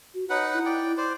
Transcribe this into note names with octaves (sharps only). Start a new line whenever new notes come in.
F#4
D#4 B4 C#5 F#5
E4
D5 G5
E4 C5 D5